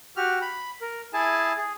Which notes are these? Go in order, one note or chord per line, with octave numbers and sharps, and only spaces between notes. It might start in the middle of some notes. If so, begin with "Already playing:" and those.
F#4 G4 F6
B5
A#4
E4 G#4 G#5 A5
G#4